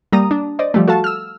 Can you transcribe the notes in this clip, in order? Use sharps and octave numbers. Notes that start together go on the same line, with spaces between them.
G3 A#3 A#5 D#6
D4
C5 D5 D#5
F3 G3 A3
F#4 A4 F5 A5
E6 F6